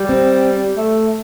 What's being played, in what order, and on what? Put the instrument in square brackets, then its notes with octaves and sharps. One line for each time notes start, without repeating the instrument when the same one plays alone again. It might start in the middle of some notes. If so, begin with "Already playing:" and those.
Already playing: [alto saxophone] G3
[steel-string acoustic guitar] C4
[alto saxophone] A3